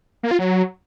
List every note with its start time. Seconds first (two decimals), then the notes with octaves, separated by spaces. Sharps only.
0.23 A#3
0.31 F4
0.39 F#3